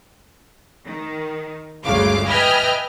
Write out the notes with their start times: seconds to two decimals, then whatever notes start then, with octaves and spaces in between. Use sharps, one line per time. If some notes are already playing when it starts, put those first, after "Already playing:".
0.86 D#3
1.83 G1 D2 C#3 G#3 F5 D6
2.28 B4 D#5 E5 G5 G#5 F6